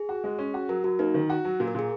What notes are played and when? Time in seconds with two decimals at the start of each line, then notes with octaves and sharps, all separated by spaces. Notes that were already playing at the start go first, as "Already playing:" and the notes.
Already playing: G#4
0.09 F#4
0.24 G#3
0.39 C#4
0.54 F#4
0.69 F#3 A#4
0.84 F#3 F#4
0.99 A#3 D#4
1.14 D#3
1.30 F#4
1.45 F#3
1.60 A#2
1.67 A#4
1.75 A#2 G#4